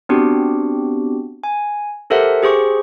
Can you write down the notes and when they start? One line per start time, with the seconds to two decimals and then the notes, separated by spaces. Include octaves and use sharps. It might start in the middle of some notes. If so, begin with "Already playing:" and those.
0.09 B3 C4 D4 F#4 G4
1.44 G#5
2.10 G4 A4 A#4 C5 E5 F#5
2.43 G4 G#4 C5 C#6